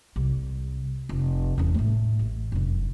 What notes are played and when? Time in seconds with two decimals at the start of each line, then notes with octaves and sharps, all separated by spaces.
0.16 C2
1.09 F1
1.58 E2 C#4
1.74 A2 A3
2.19 A1
2.52 F1 F#2